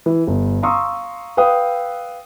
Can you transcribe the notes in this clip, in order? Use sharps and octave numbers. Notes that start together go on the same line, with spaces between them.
E3
G1
F5 A#5 C6 C#6 D#6 E6
B4 F5 G5 D#6